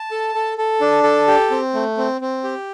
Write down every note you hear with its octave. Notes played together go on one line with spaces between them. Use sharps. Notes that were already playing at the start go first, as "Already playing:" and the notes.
Already playing: A5
A4
A4
A4
D4
A4
G4
C4
A3
C4
C4
G4